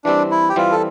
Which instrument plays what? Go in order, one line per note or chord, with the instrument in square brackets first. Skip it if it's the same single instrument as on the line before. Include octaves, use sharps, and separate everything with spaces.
[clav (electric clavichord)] E3 G3 C4 [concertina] D4
[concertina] E4
G4
[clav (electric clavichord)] E3 G3 C4 [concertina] F4
[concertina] A4